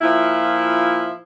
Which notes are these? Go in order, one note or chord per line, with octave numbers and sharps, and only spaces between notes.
A#2 F3 E4